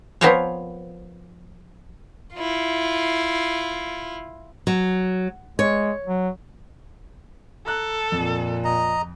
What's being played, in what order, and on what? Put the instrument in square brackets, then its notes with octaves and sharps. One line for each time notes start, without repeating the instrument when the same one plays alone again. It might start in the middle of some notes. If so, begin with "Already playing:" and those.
[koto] F3 B3 C4 A#4 C5 C#5
[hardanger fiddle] E4 F4
[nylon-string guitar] F#3
[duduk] G#3 [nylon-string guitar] C#5
[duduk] F#3
[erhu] A4 [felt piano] A#5 F#6
[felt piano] F2 [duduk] A#2
[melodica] D#5 A#5